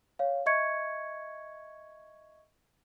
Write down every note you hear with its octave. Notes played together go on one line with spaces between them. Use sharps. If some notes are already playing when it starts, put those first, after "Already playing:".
C#5 F5
D#5 E5 C#6 G#6 C#7